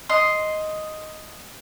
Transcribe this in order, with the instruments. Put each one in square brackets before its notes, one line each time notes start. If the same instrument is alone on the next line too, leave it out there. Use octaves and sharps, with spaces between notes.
[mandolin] D#5 C6